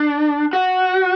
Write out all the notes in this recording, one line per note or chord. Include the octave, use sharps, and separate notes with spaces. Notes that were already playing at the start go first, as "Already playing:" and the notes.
Already playing: D4
F#4